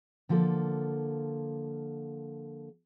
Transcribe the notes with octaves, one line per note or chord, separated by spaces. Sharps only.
D3 F3 A#3 A4